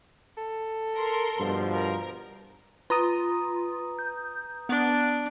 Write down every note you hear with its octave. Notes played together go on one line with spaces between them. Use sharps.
A4
A#4 C6
G2 B2 F3
A#4
F4 B4 A#5 D#6
G6
B3 D4